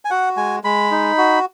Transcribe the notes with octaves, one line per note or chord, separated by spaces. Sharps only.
G#5
F#4 F#5
G#3 G#5
G#3 B5
D#4
F#4